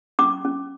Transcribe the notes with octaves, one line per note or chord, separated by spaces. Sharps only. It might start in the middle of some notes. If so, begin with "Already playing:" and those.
C#4 D6
C#4